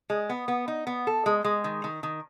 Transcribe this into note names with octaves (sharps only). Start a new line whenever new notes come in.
G#3
B3
B3
D#4
B3
A4
G#3
G#3
D#3
D#3
D#3